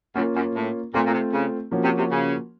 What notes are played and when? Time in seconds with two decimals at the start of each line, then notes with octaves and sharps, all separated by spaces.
0.15 F#2 A#3 C#4 F4
0.36 F#2
0.55 A2
0.94 A#2 A3 C4 F4
1.06 A#2
1.13 C3
1.33 C#3
1.71 F3 A#3 C#4 F#4
1.84 C3
1.97 C3
2.10 C#3